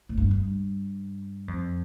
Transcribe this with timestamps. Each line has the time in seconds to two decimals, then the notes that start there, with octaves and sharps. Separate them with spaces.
0.09 A2
0.18 G2
0.31 G2
1.48 F2